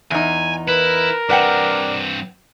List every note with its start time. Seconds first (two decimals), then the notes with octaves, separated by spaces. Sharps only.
0.11 E2 D#4 G#5
0.68 E4 A#4 B4
1.30 G2 C4 D4 B4 F#5 G5